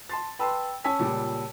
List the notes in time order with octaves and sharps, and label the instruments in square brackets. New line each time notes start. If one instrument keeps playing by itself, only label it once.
[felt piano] A5 C6 A6
[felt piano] B4 A5 C6 [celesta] G5 B5 E6
[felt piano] C#4 G#5 B6 [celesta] C#5 A5 E6
[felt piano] C#2 A#2 G3